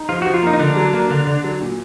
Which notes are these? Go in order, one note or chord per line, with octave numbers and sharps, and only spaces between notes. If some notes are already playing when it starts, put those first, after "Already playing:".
Already playing: D#4
F3 F4
F3 F#4
F4
A#3 D#4
D#4
D3 D4
F#3
A#3
D3
D3
F#3
A#2